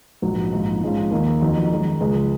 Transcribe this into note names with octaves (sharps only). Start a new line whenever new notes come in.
A#1 G#2 F#3
A#1 G#2 F3
G#2 F3 G#3 C#4 F4
D#2 D#3 A#3
F2 D#3 F#3
F#2 D#3 G#3 D#4
C#2 C#3 F3 G#3